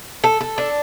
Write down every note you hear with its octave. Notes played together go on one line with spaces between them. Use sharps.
A4
A4
D4